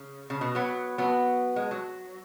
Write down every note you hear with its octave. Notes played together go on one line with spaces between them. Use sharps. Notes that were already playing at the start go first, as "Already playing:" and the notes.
Already playing: C#3
C#3
B2
F#3 B3
F#3 B3
G#3
F#3